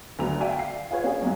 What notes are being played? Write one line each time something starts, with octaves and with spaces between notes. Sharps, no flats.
D2 D3 F#3 B3 A#5 F7
F#4 D5 E5 F5 G5 G#5
C7
F4 G#4 B4 C#5
A#3 C#4 D4 F4 G4 G#4
F#2 B2 G#3